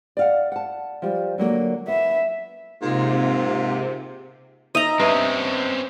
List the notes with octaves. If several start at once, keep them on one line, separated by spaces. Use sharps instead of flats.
D5 F5 F#5
F#5 A5
F3 G3
D3 F#3 A#3
B3 E5
G#2 C3 A#3 F4
D#4 D#5 E5 A#5
G2 C4 C#4 B4 E5